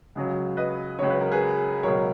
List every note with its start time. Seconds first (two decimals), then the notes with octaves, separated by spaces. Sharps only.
0.15 C#2 C#3 F#3
0.57 B4 D#5
0.99 C#2 C#3 F#3 C#5
1.10 B4
1.21 A#4
1.32 G#4 B4
1.83 C#2 B2 F#3 A#4 C#5